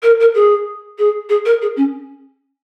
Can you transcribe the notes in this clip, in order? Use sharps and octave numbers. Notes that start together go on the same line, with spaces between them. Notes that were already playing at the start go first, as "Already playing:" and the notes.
A#4
A#4
G#4
G#4
G#4
A#4
G#4
C#4